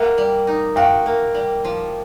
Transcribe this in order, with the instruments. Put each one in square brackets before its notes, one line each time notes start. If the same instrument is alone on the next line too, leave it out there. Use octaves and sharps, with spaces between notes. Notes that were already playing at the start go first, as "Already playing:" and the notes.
Already playing: [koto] A#3 [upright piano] E5 F#5
[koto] G3
D#4
[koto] F#4 [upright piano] F5 G5
[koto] A#3
G3
F3